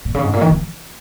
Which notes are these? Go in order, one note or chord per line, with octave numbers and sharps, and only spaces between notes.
A#2
C#3
G#2
A#2
D#3
F3